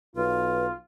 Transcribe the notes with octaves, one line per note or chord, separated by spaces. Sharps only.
B1 F4 B4